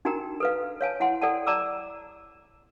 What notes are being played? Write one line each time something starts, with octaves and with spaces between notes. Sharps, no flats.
D4 D#4 F#4 A#4 G5 A#5
A4 B4 F5
C#5 F5 G#5 A5
E4 F#5 G#5 C6
A4 D5 F#5 G5 A5
D5 A5 A#5 D6 E6